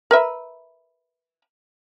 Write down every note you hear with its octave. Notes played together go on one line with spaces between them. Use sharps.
A#4 B4 E5